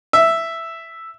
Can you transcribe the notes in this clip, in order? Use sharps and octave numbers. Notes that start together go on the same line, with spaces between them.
E5